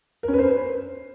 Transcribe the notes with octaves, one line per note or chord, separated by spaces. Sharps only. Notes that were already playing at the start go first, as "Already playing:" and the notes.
A#4
C#4
B4
C5